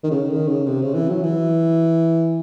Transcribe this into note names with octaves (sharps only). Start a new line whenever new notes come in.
D#3
C#3
D#3
C#3
C3
C#3
E3
F#3
E3